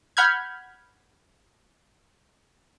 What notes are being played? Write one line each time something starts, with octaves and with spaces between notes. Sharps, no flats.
F#5 B5 F6 G6 G#6